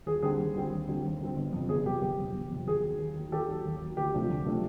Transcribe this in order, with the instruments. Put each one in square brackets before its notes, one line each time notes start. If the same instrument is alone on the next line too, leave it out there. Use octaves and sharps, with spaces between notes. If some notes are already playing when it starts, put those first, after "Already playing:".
[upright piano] D#2 G#4
D3 G3 C4 G#4
D#2
D3 G3 C4
D#2
D3 G3 C4
D#2
D3 G3 C4
G1
F2 C3
G1 G#4
F2 C3 G4
G1 G4
F2 C3
G1
F2 C3
D#2 G#4
D#3 F#3
D#2
D#3 F#3
D#2 G4 A4
D#3 F#3
D#2
D#3 F#3
D2 G4
C3 F3 A3 D4
D2
C3 F3 A3 D4